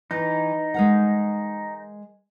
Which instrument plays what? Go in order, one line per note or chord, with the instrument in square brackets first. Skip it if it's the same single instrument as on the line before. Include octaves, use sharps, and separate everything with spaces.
[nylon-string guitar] E3 [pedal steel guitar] D#4
[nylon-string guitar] G#3 A#4 F#5